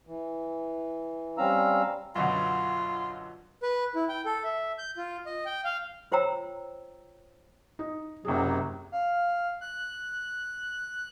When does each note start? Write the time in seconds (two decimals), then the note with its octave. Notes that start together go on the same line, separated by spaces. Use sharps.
0.07 E3
1.38 G3 C4 C#4 F5 A#5 E6
2.16 F#2 B2 D3 F4
3.63 B4
3.95 E4
4.09 G5
4.25 A4
4.44 E5
4.78 G6
4.97 F4
5.26 D#5
5.45 G5
5.64 F5
6.12 F4 C5 C#5 G5 A#5 E6
7.79 D#4
8.25 F#1 C3 F#3 G#4
8.92 F5
9.61 F#6